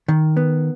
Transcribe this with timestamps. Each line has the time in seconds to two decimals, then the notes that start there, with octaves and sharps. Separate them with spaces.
0.08 D#3
0.37 B3